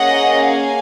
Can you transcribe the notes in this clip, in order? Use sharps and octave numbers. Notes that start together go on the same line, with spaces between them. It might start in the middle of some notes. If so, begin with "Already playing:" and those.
Already playing: A#3 C#4 G#4 D#5 F#5
F5 G#5